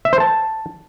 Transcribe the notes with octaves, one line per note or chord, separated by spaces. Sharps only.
E5
C5
A5